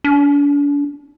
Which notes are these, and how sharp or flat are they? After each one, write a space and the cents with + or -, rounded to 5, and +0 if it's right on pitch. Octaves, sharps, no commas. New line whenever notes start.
D4 -40